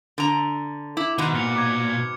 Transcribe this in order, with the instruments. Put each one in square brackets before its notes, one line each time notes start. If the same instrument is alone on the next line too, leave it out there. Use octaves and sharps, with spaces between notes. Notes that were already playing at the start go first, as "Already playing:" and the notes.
[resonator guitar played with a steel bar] D3 A#5
[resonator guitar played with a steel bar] E4 [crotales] D6
[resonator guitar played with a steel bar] G#2 B2 [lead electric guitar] D#3
[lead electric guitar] A#2 [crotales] F6 C#7 F7
[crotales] D6 G#6